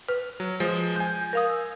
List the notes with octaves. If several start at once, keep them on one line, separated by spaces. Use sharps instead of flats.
B4 F6
F#3
F3 G#3
G#5 G6
A#4 F5 D#6
E6